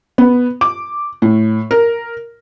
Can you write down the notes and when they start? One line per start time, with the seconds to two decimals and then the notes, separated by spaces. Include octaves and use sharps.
0.18 B3
0.61 D6
1.22 A2
1.71 A#4